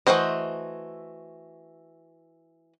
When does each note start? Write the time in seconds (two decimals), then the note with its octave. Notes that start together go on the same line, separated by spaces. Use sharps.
0.07 E3 A3 F#4 C5 D#5